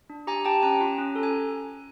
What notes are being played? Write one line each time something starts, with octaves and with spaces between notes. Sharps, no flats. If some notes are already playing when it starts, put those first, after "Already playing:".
D4
G4 G#5 A#5
G4 G5 A5
C#4 G#5 A#5
F4
C#4
A4
G#5